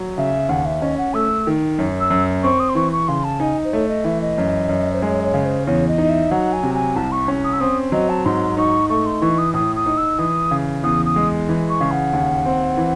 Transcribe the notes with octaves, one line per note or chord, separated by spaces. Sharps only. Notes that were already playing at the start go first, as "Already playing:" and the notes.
Already playing: F#3
C#3 E5
D#2 F#5
E5
C#4 D#5
F#5
A3 E6
D#3
F#2
E6
F#2
C4 C#6
D#6
C6
E3 C#6
C#6
C#3 C6
A5
D#4 G#5
C5
A3 C#5
D#5
E3 E5
D#5
F#2
F#2
C5
G#3 C#5
C#5
C#3
C5
E2 C#5
D#5
D#4
E5
F#3 F#5
G#5
C3
G#5
C2 A5
C#6
C#4
D#6
E6
C4 D#6
F#3 D#5
A5
G#2 C6
D#4 C#6
A3 C#6
C6
E3 C#6
D#6
A2 D#6
D#6
D#4
E6
E3 D#6
C#3
E2 D#6
D#6
G#3
E3
C#6
C#3
F#5
D#2
C4
E3